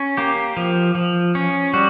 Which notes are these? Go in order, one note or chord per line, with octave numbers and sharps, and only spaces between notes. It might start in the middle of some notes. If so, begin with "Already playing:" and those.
Already playing: C#4
A#3 G4
F3
F3
C#4
G3 F#4